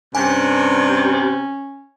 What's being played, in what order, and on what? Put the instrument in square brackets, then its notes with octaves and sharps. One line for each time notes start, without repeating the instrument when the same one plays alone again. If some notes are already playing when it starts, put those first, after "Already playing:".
[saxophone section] G2 D4 [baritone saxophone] C3 [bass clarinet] C#4 [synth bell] G#5